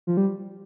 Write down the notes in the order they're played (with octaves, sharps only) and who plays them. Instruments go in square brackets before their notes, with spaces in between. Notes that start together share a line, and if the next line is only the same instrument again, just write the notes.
[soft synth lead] F3
G3